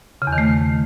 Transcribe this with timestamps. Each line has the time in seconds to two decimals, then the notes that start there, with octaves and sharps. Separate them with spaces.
0.22 C#3
0.27 E2
0.33 D#3
0.38 A3